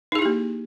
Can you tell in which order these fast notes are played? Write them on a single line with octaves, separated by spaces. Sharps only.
D#4 G#4 E4 G4 A#3